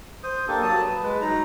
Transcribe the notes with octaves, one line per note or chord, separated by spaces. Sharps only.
C5 D#6
A#3 D4 G4 A4
F#3 A5 D#6
B4
G#3 B4
F#3 D#4 A#5